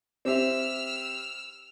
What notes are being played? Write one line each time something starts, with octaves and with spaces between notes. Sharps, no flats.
C4 G4 E5 E6 F6